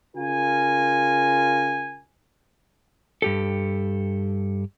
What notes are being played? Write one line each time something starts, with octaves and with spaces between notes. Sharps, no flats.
C#3 F4 A#4 G#5
G2 G4 A4